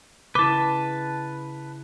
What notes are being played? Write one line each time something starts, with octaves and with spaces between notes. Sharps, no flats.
C#3 E4 B4 A5 D6